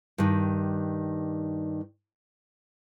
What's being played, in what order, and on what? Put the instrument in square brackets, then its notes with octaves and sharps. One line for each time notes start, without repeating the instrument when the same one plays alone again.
[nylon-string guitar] G2 D#3